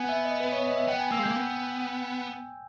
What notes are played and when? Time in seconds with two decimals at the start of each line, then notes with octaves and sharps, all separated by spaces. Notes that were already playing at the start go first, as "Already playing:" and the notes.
Already playing: B3 G#5
0.09 E5
0.25 D#5
0.40 B4
0.52 C#5
0.64 D#5
0.76 E5
0.88 B3 G5
1.00 G#5
1.12 A#3 E6
1.19 G#3
1.23 A#3 G6
1.36 B3